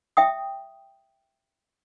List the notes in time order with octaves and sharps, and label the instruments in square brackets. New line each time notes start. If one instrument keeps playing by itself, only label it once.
[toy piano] E5 G5 D#6